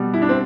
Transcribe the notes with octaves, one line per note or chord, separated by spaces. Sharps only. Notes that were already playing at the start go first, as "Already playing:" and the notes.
Already playing: B2 G3
E4
D4
C4